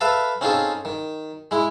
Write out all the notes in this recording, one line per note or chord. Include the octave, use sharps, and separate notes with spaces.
A4 B4 E5 F5 A5
C4 C#4 D#4 F4 G#4 A4
D#3
G#3 E4